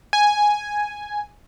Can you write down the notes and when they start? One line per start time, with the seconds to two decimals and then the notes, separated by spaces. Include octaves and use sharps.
0.13 G#5